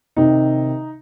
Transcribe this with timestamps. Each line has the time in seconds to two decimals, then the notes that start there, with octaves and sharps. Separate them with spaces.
0.17 C3 D#3 D#4